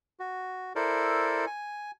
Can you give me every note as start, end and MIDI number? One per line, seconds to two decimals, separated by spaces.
0.19 0.73 66
0.76 1.45 64
0.76 1.45 69
0.76 1.45 70
0.76 1.45 72
0.76 1.45 74
1.46 1.91 80